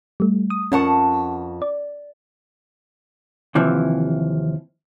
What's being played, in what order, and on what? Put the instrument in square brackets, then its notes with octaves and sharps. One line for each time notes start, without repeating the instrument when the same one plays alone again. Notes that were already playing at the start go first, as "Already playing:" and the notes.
[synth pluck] G3 A3
D#6
[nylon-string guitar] F2 F#5 A5 [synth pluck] C#4 A#4 C#6
[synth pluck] D5
[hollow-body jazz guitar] D#2 C3 E3 F3